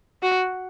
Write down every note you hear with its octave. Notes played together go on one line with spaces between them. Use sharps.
F#4